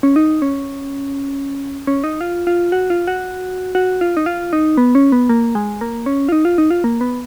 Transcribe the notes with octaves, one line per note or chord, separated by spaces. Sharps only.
C#4
D#4
C#4
C#4
D#4
F4
F4
F#4
F4
F#4
F#4
F4
D#4
F4
D#4
B3
C#4
B3
A#3
G#3
A#3
C#4
F4
D#4
F4
D#4
F4
A#3
B3